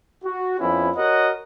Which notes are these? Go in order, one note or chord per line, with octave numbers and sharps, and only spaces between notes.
F#4
F2 B3 C#4 E4
F#4 A#4 C#5 D#5 F#5